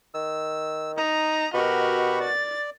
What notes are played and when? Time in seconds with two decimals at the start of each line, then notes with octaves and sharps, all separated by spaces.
0.14 D#3 E6
0.97 D#4 A#5 D#6
1.54 B2 F#4 G4 A#4 D#5 B5 C#6
2.20 D5 A6